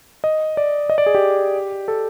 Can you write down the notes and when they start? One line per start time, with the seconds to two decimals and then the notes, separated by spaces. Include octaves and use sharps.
0.24 D#5
0.57 D5
0.90 D#5
0.98 D5
1.06 G#4
1.15 G4
1.88 A4